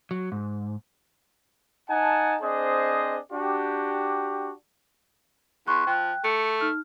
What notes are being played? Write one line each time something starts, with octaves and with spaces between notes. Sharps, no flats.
F#3
G#2
D#4 F#5 G#5 A5
C4 D4 G#4 C5 D#5
D4 F#4 G4
E2 C6 C#6 F#6
F3 G5 F#6
A3 C#7
D#4 F6